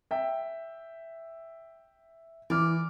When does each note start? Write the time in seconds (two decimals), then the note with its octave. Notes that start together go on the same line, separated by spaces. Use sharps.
0.11 E5 G5
2.50 E3 D5 F6